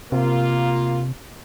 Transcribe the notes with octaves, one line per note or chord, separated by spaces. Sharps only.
C3 A#3 F4